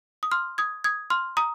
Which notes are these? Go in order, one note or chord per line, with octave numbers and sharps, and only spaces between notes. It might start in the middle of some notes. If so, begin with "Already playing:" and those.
D#6
C6 F6
D#6 G#6
D#6 G#6
C6 F6
A#5 D#6